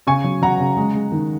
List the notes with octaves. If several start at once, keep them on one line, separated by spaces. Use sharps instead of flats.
C#3 G#5 C#6
F#3
F#3 F#5 A#5
C#3
G#3
G#3
D#3